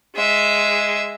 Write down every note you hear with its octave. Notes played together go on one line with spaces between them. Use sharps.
G#3 E5